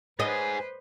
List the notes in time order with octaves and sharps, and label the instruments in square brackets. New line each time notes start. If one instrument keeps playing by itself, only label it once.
[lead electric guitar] G#2 G#4 [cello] B4 C5 [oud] D#5